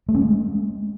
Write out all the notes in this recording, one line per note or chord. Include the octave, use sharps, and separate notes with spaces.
A3
C#4
G#3